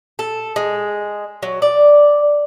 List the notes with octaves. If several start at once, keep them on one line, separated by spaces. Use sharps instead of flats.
A4
G#3
F#3
D5